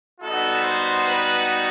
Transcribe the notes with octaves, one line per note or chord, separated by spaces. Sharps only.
G3 B3 D#4 F#4 A4
C5
B4